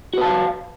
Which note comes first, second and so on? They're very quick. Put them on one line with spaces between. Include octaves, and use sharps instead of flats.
F#4 B4 A5 F5